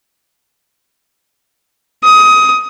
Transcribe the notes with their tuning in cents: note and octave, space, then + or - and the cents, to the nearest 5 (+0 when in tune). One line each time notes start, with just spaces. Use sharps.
D#6 +20